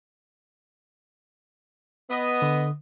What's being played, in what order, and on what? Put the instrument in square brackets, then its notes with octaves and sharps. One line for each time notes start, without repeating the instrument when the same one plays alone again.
[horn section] B3 D#5
[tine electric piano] D3